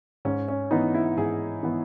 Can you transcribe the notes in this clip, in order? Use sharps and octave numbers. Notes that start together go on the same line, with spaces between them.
G#2 C#4
C#4
E3 B3 D#4
E4
G#2 G#4
E3 B3